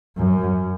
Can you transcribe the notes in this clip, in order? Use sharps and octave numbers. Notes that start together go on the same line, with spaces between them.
F#2